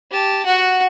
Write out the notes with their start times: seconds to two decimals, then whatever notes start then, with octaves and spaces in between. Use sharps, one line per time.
0.11 G4 A5
0.45 F#4 F#5